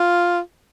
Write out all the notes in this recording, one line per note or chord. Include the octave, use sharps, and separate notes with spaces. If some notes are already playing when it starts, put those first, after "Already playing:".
Already playing: F4